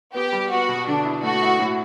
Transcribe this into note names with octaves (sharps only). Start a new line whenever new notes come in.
B3 G4
G3
B3 F#4
B2
D3 D4
E4
A3 F#4
E4
A2